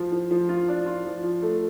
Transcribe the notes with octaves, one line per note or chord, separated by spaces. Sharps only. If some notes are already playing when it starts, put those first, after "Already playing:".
Already playing: F3 F4
F3
F3
F4
D4
F4
F3
F3
A3